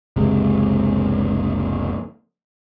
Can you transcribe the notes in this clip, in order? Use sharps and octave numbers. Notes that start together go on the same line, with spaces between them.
F#1 C#2 C3 G#3